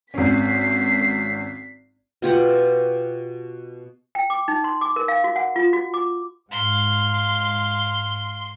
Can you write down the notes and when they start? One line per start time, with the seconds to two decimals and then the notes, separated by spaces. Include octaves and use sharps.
0.14 G#1 C#4 B6 C7
2.22 B2 F4 G4 F#5
4.15 G5
4.30 D6
4.48 D#4
4.64 C6
4.81 D6
4.96 A#4
5.08 F5
5.24 F#4
5.36 F#5
5.56 F4
5.73 F#4
5.94 D6
6.51 G#2 F5 C6